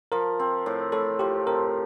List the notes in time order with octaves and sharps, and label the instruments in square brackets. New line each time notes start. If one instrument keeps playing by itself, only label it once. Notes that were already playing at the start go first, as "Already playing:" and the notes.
[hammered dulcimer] F3 [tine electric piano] A#4
[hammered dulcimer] C4
A2
[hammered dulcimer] A2 [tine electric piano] A4
[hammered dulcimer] F3 [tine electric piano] G4
[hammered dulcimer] C4 [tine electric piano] A#4